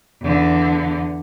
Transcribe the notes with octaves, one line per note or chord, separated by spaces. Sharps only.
E2 D3